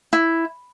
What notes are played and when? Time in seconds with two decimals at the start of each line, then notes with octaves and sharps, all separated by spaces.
0.13 E4